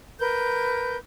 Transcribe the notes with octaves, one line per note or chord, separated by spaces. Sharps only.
A#4 B4 G6